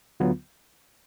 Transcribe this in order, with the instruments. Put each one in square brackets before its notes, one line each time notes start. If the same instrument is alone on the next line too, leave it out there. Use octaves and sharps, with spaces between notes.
[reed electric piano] D2 D3 F#3 B3 F4